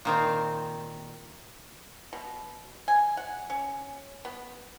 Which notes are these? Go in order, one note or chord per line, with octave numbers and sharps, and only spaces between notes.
A#2 D#3 C4
B2
G#5
F#5
C#4
B3